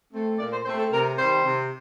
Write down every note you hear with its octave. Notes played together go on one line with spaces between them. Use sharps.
A3 C4
A#2 D5
C5
A3 C4 C5
A4
C3 A#4
D#3 G3 C4 C5
C3